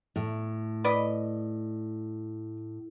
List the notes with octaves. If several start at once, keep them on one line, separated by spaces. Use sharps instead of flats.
A2
B4 D5 D#5